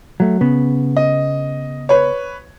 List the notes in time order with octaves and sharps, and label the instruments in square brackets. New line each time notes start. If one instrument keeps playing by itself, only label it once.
[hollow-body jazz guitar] F#3 A3
C#3 B3
[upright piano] D#5
B4 C#5